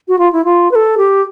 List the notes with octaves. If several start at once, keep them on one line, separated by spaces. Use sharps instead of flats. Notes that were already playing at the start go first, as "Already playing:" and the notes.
F#4
F4
E4
F4
B4
A4
G4